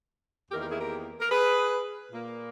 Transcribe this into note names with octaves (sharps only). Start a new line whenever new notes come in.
E2 D#3 A#3 G4 A#4
G4 A#4
E4 G#4
G4 A#4
A#4
G#4 B4
A#2 A#3